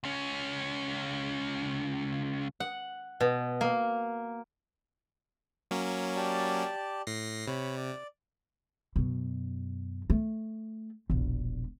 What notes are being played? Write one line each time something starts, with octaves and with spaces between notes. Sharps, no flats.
C#2 C#4
F#5
B2
A#3
F#3 A#3 C#4
G4 D5 A5
A2 A#6 C7
C3 C#5 B5
D5
F#2 B2
A3
E1 A#1